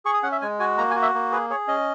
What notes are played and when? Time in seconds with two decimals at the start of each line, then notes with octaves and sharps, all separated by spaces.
0.05 G#4 C#6
0.14 D#6
0.23 C#4 F#5
0.32 E5
0.42 G#3 G#5
0.59 F#4 G#5
0.78 A#3 A#5
0.90 G#5
0.95 F#4
1.02 E5
1.14 A#3
1.31 G#4 B4
1.50 G#4 C#5
1.68 C#4 D#5